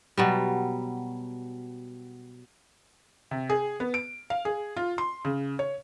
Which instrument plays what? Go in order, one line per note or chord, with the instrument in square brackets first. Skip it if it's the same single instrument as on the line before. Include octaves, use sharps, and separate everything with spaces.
[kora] B2 F#3 G3
[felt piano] C3
G#4
B3
D7
F5
G#4
F4
C6
C#3
C#5